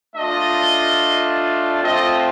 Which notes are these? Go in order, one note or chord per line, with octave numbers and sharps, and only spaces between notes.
A3 D4 F4 D#5
A3 C4 F4 D#5